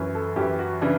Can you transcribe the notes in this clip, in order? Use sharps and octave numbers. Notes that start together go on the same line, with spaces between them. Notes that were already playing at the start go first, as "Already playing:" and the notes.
Already playing: F#2 E3
A4
F#2 E3 G4
F#4
C#3 E3 D4